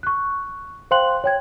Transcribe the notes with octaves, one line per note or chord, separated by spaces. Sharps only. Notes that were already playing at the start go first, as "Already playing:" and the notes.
C#6 F#6
C5 F5 G5 C6 F#6 F#7
C#5 G5 G#6